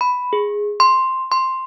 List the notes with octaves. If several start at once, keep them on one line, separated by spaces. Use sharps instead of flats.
B5
G#4
C6
C6